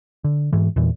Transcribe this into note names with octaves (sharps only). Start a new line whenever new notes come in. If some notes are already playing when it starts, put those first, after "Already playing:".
D3
G#2 E3
E2 A#2 E3